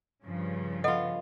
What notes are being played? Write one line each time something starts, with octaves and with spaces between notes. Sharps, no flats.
G2 C#3 F3
B3 F4 A4 D#5 F#5